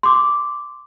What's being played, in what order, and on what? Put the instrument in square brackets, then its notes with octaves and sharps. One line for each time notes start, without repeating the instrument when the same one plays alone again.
[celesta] C6 D6